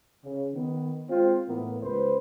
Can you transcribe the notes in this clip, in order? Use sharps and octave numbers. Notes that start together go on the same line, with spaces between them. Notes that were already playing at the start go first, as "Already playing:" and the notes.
C#3
D#3 B3
G#3 C4 F4 C5
A2 E3 A#3 B3
C#2 B4 C5